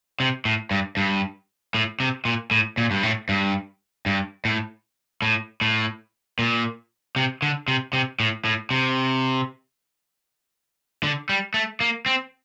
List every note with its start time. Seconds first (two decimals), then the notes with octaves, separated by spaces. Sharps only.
0.20 C3
0.45 A2
0.71 G2
0.97 G2
1.75 A2
2.00 C3
2.25 A#2
2.51 A2
2.78 A#2
2.91 G2
3.03 A2
3.29 G2
4.06 G2
4.45 A2
5.22 A2
5.61 A2
6.39 A#2
7.16 C3
7.42 D3
7.68 C3
7.93 C3
8.20 A2
8.45 A2
8.71 C3
11.03 D3
11.29 G3
11.54 A3
11.81 A#3
12.06 C4